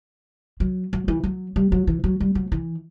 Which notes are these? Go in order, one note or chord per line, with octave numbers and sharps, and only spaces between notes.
F#3
F#3
E3
F#3
G3
F#3
E3
F#3
G3
F#3
E3